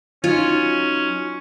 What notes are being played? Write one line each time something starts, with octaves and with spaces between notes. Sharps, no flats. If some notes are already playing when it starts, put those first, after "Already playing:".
F#3 C#4 D#4 F4